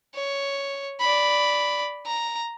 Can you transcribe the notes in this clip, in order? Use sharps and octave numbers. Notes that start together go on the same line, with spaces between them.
C#5
D5 B5
A#5